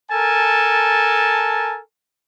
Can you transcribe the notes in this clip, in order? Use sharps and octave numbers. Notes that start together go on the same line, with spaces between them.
A4 A#4 G#5 A5